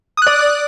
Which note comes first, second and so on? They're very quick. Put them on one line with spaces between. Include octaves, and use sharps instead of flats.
D#6 F#6 D5